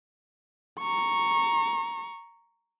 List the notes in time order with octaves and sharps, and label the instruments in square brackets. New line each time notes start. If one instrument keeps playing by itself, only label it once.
[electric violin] A#5 C#6